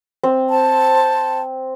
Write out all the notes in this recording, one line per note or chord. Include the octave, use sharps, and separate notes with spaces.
C4
C5 A5